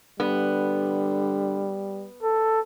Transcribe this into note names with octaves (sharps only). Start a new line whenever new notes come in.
D3 G3 B3
A4